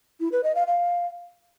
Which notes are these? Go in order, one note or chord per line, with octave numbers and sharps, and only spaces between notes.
E4
B4
D#5
F5
F5